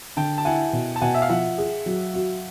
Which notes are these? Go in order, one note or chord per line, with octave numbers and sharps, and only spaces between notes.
D3 G5 A5
A5
E4 F#5 G#5
B2
A5
B2 F#5 G#5
E5
F5
F3 E5 F#5
G#4
F#3
F#4